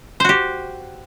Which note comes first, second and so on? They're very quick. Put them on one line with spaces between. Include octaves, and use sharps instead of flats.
C5 F#4 G4